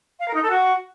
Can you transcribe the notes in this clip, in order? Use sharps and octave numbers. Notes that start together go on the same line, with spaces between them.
F5
A#4
D#4
A4
F#4